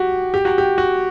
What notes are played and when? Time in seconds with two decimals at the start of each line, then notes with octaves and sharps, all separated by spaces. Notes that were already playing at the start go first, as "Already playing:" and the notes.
Already playing: F#4 G4
0.34 G4
0.45 F#4
0.58 G4
0.78 F#4